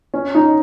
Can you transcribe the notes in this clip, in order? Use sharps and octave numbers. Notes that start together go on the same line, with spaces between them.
C#4
D#4